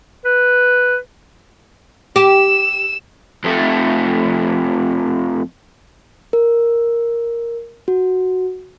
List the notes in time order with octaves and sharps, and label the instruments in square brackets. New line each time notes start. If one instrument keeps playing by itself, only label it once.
[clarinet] B4
[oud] G4 [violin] E6 E7
[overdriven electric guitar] F2 A3
[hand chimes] A#4
F#4